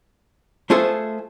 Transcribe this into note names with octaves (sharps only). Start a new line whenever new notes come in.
A3 F4 G#4 A4 C5 E5